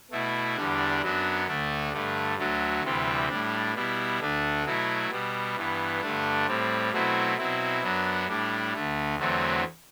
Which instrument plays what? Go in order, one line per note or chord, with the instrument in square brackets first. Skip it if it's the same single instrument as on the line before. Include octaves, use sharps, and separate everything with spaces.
[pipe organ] B2 A3 E4
E2 D3 G3 D4
F#2 F#3 B3 D4
D2 D3 A3 D4
G2 D3 A3
D2 D3 F#3 A3
D2 C3 E3 G3 C4
A2 G3 D4
B2 G3 B3 E4
D2 D3 A3 D4
B2 F#3 A3 E4
B2 G3 B3
G2 E3 B3
G2 D3 A3 D4
A2 G3 C4
B2 F#3 A3 C4 E4
B2 F#3 C4 E4
F#2 F#3 B3 D4
A2 G3 D4
D2 D3 A3
E2 D3 F#3 A3 C4